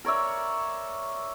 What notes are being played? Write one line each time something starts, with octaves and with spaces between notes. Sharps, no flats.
A#4 C#5 D5 E5